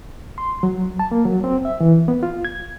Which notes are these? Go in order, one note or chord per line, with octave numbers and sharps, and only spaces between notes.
C6
F#3
A5
A#3
F#3
C4
E5
E3
B3
F4
G#6